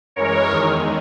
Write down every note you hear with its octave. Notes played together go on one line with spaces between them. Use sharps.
F#2 E3 G#3 A#4 C#5
E2 D#3 G#3